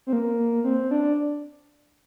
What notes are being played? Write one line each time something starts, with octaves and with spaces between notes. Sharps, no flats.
C4
A#3
C4
D4